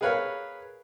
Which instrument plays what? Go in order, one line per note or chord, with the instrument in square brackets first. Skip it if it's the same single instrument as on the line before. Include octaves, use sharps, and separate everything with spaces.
[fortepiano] G#4 A#4 B4 C#5 F5